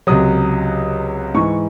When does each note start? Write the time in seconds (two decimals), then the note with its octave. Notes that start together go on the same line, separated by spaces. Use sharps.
0.07 C#2 C3 F#3 D#6
1.34 G#2 E3 C#6